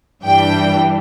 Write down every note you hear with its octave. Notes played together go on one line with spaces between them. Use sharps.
G2 E3 G3 D4 G5